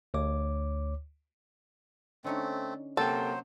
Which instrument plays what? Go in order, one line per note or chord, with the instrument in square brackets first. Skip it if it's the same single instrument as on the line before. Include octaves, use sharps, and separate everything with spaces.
[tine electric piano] D2 C#5 D6
[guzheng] D3 C#4 D#4 [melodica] A3 C4
[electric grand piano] C3 A#3 G5 [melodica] F#3 C5 [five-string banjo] A4